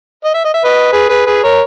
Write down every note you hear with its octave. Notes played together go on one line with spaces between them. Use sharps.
D#5
E5
D#5
E5
B4 D#5
G#4 B4
G#4 B4
G#4 B4
A#4 C#5